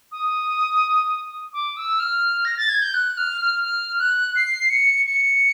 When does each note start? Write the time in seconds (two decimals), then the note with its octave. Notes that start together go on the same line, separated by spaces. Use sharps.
0.12 D#6
1.53 D6
1.77 E6
2.00 F6
2.45 A#6
2.57 A6
2.69 G#6
2.82 G6
2.94 F#6
3.17 F6
3.42 F6
3.64 F6
3.99 F#6
4.36 C7
4.70 C#7
5.06 C#7